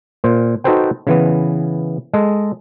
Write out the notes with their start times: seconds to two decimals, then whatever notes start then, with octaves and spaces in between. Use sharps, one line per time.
0.24 A#2 C5
0.64 D#4 F#4 A4 B4 C5 G5
1.07 C#3 E3 B3
2.14 G#3 A4 D#5